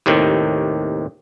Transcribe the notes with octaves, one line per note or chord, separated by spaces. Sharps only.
D#2 A2 C3 D#3